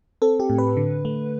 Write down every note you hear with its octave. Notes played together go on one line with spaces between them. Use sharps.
C4 A4
G4
A2
B4
D3
A3